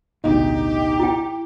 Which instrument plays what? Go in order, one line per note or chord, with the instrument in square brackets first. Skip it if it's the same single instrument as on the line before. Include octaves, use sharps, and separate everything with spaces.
[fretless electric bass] A1 D2 B2 [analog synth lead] D#4 [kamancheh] G4
[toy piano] E4 G5